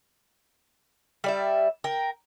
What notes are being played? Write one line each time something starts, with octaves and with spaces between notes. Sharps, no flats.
G3 D5 E5
A#4 G5